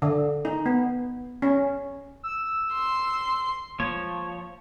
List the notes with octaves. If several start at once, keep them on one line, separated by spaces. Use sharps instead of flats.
D3
D#4
B3
C#4
E6
C6
F3 G#3 A#3 C#5